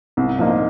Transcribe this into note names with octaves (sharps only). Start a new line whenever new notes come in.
C2
A#2 F3 A#3 D#4